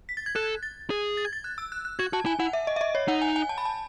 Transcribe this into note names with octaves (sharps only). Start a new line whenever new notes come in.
B6
A6
G#6
A4 F#6
A6
G#4
A6
G#6
A6
F#6
E6
F#6
F#6
F#4 G#6
F#4 A5
E4 G#5
E4 F#5
E5
D#5
E5
D#5
C#5
D#4 F#5
G#5
G#5
A5
B5
A5